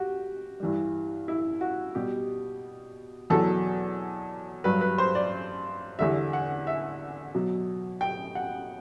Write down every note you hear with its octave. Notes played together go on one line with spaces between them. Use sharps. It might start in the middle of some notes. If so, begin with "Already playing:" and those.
Already playing: F#4 G4
G2 E3 G3
E4
F#4
B2 G3 G4
E2 B2 F#3 A4
G2 F#3 B4
B4
C5
D5
E2 D3 G3 E5
F#5
E5
B2 F#3
G5
F#5